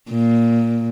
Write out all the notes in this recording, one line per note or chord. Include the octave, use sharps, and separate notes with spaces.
A#2